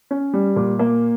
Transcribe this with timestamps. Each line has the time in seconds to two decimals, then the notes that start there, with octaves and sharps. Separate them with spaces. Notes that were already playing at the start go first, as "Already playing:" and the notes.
0.11 C#4
0.33 G3
0.56 A#2
0.79 A#3